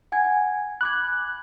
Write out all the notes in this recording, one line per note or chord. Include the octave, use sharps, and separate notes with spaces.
F#5 G#5 G#6
B5 D6 F#6 G#6